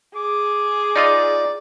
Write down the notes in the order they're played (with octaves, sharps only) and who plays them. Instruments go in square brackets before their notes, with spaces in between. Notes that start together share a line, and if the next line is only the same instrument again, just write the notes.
[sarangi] G#4 [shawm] D6
[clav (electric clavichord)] D#4 F4 D#5 [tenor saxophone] D5